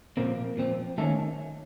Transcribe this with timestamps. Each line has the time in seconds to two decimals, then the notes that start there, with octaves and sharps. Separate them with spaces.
0.17 A#2 F3 A#3 C4 A#4
0.57 A#2 F3 C4
0.98 D#3 A3 A#3 C#4 A4